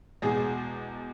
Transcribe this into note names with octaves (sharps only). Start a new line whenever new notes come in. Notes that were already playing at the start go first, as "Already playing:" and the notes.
E2 B2 G#3 G#4